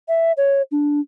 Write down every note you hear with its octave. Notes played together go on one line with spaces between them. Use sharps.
E5
C#5
D4